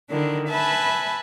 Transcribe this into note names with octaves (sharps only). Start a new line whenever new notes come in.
D3 D#3 D4 E4
B4 E5 G#5 A5 B5